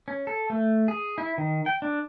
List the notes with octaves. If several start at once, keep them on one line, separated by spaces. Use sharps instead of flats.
C#4
A4
A3
G#4
E4
D#3
G5
D4